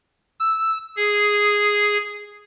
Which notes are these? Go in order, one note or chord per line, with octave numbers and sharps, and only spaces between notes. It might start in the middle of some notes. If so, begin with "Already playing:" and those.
E6
G#4